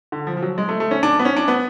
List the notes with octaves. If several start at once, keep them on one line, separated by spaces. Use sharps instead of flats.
D3
F3
F3
F#3
G#3
A3
A3
C#4
D4
B3
C#4
D4
B3